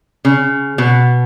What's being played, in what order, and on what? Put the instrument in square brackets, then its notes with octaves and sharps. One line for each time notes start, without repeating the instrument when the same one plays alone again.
[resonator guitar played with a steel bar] C#3
B2